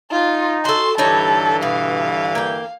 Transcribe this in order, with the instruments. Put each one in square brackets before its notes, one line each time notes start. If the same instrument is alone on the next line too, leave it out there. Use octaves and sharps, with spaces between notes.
[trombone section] D#4 [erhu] F4
[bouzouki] F#4 A4 [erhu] C6
[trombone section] G2 D3 E3 [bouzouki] G3 D#4 C#5 [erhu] A4
[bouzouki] B2 [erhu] F5
[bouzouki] A#3 G5